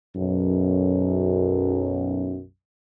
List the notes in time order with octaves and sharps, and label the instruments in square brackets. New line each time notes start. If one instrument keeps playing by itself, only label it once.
[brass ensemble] B1 F#2